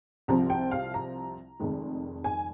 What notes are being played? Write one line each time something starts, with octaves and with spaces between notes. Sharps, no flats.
C2 C3 F3 C4 A#5
G5
F5
A#5
F1 F2 D#3 G#3
G#5